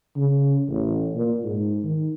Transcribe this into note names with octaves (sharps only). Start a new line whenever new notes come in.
C#3
A1
A#2
G#2
D#3